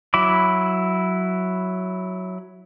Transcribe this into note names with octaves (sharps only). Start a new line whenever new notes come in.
F#3 E4 B5 D6